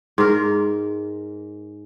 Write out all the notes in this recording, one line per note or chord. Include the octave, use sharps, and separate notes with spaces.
G#2 A#4